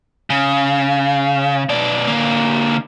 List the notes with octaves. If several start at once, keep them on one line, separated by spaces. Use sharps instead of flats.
C#3
B2 D5
D3 A#3